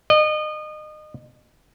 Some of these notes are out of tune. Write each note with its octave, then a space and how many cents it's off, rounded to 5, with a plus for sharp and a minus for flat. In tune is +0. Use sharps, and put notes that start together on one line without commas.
D#5 -30